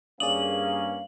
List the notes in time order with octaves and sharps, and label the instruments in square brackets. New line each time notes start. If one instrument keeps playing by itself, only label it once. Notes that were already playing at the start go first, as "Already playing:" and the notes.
[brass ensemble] G2 A#3 C#4 [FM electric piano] G#4 D5 D#6 [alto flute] F5 [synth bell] F#7